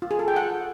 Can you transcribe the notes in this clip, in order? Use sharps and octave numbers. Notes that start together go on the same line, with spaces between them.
F4
G#4
A4
G5
F#5